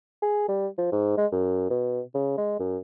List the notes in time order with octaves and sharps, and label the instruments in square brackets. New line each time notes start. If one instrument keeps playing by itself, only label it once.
[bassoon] G#4
G3
F3
G#2
G#3
F#2
B2
C#3
G#3
F#2